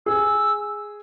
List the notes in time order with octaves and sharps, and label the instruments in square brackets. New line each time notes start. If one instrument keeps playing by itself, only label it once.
[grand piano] G#4 [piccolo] E6